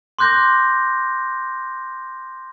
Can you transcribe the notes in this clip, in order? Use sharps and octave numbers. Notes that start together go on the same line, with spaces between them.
C6 D6 F#6 G6 A#6